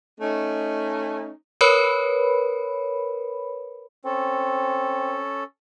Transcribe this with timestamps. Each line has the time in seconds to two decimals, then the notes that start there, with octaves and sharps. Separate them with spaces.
0.20 A3 C#4 D#4
1.61 A#4 B4 C#5 B5
4.05 C4 C#4 A4